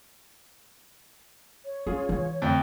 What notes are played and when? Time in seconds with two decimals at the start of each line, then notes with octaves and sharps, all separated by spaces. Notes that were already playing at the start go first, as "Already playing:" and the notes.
1.65 C#5
1.87 C#4 F4 G#4
2.09 E3
2.42 F2 D3 A3